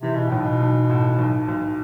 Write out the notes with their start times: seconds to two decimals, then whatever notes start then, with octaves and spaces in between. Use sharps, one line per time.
0.02 C3 E3
0.15 B2
0.28 B1 A2
0.41 B2
0.61 B1
0.90 A2
1.19 B1
1.48 B1